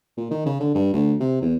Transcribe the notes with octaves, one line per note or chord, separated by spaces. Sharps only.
A#2
D#3
C#3
D3
G2
D2
C3
E2